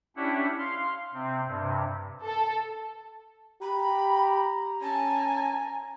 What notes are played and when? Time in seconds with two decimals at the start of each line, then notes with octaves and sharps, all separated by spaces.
0.16 C#4 D4 E4 G4 E5 F#5
0.59 F5 C6
1.14 C3 C4
1.47 G2 C3
2.24 A4
3.62 G4 A#5 B5
4.83 C#4 G#5 A5